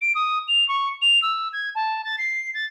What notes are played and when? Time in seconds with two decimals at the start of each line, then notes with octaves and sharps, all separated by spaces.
0.02 D7
0.15 D#6
0.48 F7
0.68 C#6
1.02 F7
1.22 E6
1.53 G#6
1.75 A5
2.05 A6
2.18 C7
2.54 A6